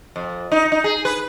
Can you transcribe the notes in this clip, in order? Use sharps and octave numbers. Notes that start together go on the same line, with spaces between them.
F2
D#4
D#4
G#4
B4